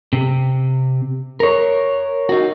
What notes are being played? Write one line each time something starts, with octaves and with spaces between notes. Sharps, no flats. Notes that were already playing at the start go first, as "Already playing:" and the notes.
C3
A#4 C#5
D#4 F#4